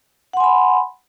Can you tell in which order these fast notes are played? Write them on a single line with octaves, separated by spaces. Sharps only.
F#5 C6 G#5 B5